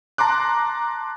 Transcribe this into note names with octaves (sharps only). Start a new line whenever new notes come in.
A5 A#5 C6 D6 F#6